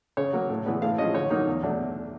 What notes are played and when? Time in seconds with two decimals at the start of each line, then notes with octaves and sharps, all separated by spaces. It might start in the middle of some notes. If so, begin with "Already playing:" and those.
0.17 C#3 C#5
0.33 F#3 A#3
0.49 A2
0.65 E3 G#3 B3 D4
0.82 A2 F5
0.98 F3 G#3 C#4 D#5
1.15 D3 C#5
1.30 F#3 A#3 D#4
1.47 E2
1.63 B2 F#3 A3 D4